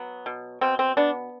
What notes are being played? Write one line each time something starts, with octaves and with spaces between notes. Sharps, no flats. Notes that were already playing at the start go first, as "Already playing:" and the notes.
Already playing: F#3 B3
B2
B2 C4
C4
B3 D4